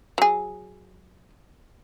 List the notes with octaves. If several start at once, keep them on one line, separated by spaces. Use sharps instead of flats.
F#3 G#4